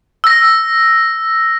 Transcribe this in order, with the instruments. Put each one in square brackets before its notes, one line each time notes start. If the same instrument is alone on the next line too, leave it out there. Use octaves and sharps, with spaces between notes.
[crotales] E6 A#6